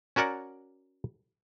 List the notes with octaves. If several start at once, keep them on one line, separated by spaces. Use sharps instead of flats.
C#4 F#4 A#4 D5 F#5